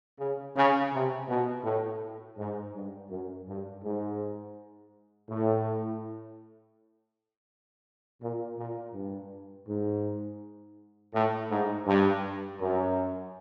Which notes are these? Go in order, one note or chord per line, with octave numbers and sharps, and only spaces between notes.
C#3
C#3
C3
B2
A2
G#2
G2
F#2
G2
G#2
A2
A#2
A#2
G2
G#2
A2
G#2
G2
F#2